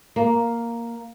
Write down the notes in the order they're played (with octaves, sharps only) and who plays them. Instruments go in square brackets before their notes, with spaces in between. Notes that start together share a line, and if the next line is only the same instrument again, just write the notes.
[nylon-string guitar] A#3